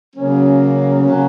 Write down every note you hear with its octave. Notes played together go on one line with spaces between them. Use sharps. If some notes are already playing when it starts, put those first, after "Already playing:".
C#3 F#3 A#3 C#4
C#3 F#3 A#3 C#4